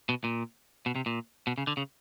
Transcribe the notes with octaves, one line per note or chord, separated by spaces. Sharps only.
B2
A#2
B2
C3
A#2
B2
C#3
D3
C#3